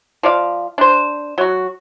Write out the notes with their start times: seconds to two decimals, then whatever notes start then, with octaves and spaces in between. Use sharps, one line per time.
0.23 F3 D5 F5
0.78 D4 C5
1.38 F#3 F#4